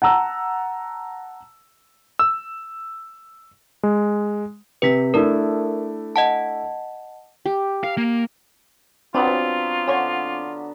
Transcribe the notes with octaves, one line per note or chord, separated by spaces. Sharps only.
F#5 A5 A#5 E6
E6
G#3
C3 G4 B4 B6
A3 D4 E4 A#4
D#5 F#5 A5
G4
A#4 F5
A#3
F#3 B3 C4 D4 F4 B4 C5 D6
D3 C#4 C5 C#5